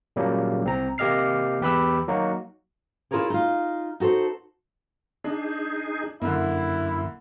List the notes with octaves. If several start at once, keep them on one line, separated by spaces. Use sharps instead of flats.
A#2 C#3 F#3 G3 A#3
C2 C4 A#5
C3 A#3 G4 D#5 F6 C7
E2 G4 B4 B5 E6
F#3 A#3 D#4 F#4
E4 F4 G#4 A#4 C#5 D5
D#4 F4
D#4 F#4 A4 C5
D4 D#4 G#4
F#2 D3 A#3 E4